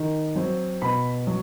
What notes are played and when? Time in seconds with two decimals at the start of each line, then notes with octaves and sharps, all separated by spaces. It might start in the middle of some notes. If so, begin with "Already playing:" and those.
Already playing: D#3
0.36 F#3 C4
0.82 B2 B5
1.27 F#3